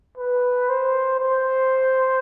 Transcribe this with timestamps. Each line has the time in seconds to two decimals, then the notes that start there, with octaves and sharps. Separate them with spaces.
0.17 B4
0.69 C5
1.20 C5